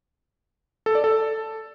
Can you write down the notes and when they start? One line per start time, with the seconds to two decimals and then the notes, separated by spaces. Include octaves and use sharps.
0.86 A4
0.95 D5
1.04 A4